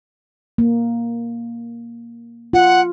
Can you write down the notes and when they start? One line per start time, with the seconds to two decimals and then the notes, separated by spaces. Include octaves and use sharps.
0.58 A#3
2.53 F4 F#5